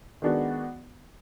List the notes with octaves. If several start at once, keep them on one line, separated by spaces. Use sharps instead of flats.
D#3 G#3 B3 D4 F#4